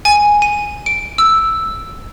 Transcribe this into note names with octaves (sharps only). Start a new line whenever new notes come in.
G#5
D#7
D7
E6